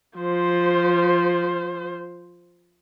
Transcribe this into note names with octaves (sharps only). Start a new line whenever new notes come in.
F3 C5